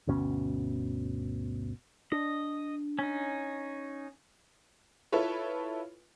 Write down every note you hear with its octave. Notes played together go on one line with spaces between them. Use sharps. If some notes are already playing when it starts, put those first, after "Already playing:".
G1 D2 B2 C#4
D4 D#5
C#4 D#4
E4 F4 A4 B4 C#5